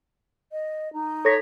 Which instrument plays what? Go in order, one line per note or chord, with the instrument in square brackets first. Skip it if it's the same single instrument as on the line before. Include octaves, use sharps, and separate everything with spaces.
[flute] D#5
D#4
[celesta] A4 A#6 B6 [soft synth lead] C#5